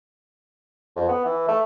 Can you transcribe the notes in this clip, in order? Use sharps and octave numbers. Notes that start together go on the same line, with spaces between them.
F2
B3
E3
A3